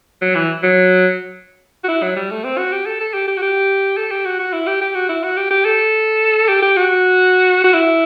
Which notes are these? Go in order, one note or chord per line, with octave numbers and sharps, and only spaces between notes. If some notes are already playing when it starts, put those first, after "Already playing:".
F#3
E3
F#3
F#4
E4
F#3
G3
A3
C4
F#4
G4
A4
A4
G4
G4
F#4
G4
A4
G4
F#4
F#4
E4
G4
G4
F#4
E4
F#4
G4
G4
A4
G4
G4
F#4
F#4
E4